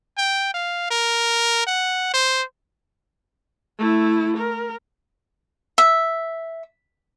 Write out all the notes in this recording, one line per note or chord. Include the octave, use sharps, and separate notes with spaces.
G5
F5
A#4
F#5
C5
A3 E4
A#4
E5